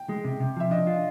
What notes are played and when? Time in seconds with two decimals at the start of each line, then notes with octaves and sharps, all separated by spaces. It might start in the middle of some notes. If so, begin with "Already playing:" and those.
Already playing: G5
0.09 G#3
0.24 C3
0.40 C3
0.56 F3 E5
0.71 D4 D#5
0.87 F4